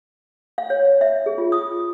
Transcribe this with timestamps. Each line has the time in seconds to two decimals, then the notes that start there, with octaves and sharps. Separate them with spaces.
0.58 F5
0.70 C#5
1.01 E5
1.26 G#4
1.38 F4
1.52 D#6